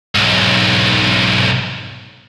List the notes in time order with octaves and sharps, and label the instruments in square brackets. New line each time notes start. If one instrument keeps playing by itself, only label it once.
[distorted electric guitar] B1 G#2